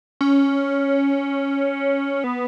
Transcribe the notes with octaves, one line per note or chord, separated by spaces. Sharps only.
C#4
B3